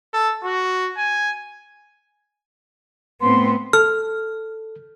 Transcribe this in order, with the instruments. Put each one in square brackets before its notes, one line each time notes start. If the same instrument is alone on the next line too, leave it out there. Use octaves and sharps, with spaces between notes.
[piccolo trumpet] A4
F#4
G#5
[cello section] A2 B3 C4 [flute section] C6
[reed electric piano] A4 [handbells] F6